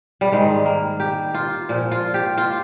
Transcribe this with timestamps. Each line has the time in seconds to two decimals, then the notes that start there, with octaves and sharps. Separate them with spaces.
0.21 G3
0.32 G#2 D#3 G3 G#3
0.66 A#3
1.00 G4
1.34 F4
1.69 A#2 F3
1.92 F4
2.14 G4
2.38 F4